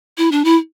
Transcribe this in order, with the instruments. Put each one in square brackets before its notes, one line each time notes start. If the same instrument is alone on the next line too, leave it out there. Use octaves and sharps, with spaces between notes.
[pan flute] E4
D4
E4